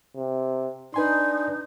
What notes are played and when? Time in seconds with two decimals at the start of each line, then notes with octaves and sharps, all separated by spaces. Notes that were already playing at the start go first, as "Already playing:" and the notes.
0.16 C3
0.94 D4 D#4 B4 G#5 C6